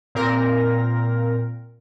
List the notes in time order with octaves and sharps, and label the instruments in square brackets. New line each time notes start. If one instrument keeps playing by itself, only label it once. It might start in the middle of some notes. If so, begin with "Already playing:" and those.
[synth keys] A#2 C4 A#4 A#6